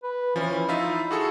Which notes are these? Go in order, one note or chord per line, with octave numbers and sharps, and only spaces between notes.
B4
E3 F3 C#4
E4
D#4 F4 E5
F#4 G#4 A4